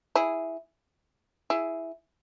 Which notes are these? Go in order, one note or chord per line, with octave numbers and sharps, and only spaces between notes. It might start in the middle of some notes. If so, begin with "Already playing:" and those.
E4 G#4
E4 G#4